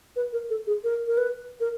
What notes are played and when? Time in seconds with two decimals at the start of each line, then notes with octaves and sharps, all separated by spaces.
0.16 B4
0.33 A#4
0.50 A4
0.67 G#4
0.84 A#4
1.07 A#4
1.18 B4
1.60 A#4